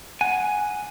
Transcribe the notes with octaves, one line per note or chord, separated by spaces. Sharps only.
F#5 G#5